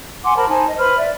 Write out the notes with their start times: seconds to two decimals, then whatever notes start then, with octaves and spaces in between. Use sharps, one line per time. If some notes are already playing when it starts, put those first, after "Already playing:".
0.24 F#5 G#5 C6 D6
0.37 A#4 C5 A5 B5
0.49 D#4 C5 G#5 A5
0.67 D#5
0.78 B4 C5 B5 F6
0.98 D5 E5